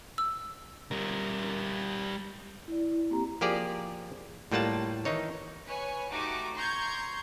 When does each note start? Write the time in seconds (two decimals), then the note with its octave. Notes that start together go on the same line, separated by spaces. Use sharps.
0.18 E6
0.91 G3 A#4
2.68 E4 D5
3.10 A#3 C4 G4 A#5
3.41 F3 A#3 G4 G#4 D5
4.52 A2 G3 A#3 F4 F#5 A5
5.05 D#3 E3 D#4 C#5
5.64 B4 C#5 G#5
6.11 A3 D#4 F#4 G4 D6 D7
6.55 A#5 C6 C#6 G6 G#6